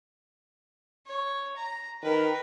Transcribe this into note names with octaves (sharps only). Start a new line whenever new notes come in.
C#5
A#5
D#3 A#4 B4